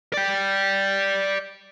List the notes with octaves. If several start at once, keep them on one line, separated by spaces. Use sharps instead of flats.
D5 G5